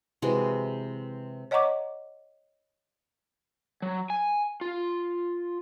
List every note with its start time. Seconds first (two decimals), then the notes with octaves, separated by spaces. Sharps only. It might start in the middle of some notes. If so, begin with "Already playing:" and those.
0.22 C3 E3 G#3 F#4
1.51 C#5 D#5 F#5 A#5 C#6 D6
3.82 F#3
4.10 G#5
4.61 F4